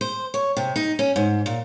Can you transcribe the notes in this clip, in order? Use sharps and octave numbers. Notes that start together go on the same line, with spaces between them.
C5
C#5
C3
D#4
C#4
G#2
A#2